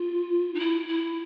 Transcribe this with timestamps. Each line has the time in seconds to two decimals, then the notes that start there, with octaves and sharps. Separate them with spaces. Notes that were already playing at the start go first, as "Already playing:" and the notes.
Already playing: F4
0.55 D#4
0.60 E4
0.88 E4